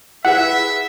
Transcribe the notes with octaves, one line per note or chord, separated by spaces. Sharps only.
E4 G#4 B4 E5 F#5